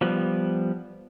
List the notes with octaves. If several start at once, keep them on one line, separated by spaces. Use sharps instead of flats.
F3 G3 B3